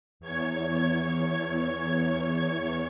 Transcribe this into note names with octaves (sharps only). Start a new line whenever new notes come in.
E2 C#5 G#6